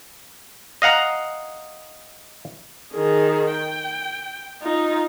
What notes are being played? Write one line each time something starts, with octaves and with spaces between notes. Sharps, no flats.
D#5 F5 F#5 A#5
D#3 G#4
G5
D#4 F4